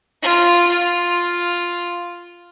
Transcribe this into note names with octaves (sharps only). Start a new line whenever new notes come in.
F4
F4